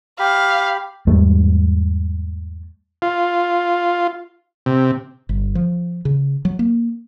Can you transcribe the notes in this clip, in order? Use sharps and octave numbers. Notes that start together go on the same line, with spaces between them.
G4 F5 B5
E2 G#2 G3 A3
F4
C3
G1
F3
C#3
F#3
A#3